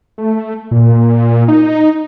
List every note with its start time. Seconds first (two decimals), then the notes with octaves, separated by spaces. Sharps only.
0.18 A3
0.71 A#2
1.48 D#4